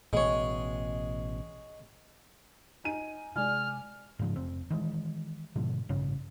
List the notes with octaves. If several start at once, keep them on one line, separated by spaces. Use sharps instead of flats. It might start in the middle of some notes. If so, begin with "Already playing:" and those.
A1 B2 G#3 C#5
D#4 G#5 D#7
C3 G#3 D5 G#5 F6
G#2 C#3 E3 F3
F1 C4
D#3 E3 G#3
G#2 B2 D3 F3
A1 G2 C#3 C#4